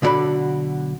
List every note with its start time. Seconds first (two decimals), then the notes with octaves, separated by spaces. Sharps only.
0.02 B1 D3 D4 F#4 D5 B5